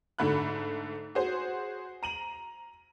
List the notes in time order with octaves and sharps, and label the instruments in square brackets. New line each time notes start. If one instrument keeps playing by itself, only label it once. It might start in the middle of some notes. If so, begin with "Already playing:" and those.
[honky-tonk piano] G#2 D3 A3 B5 F#6
F#4 G#4 C5
A#5 D#7 F#7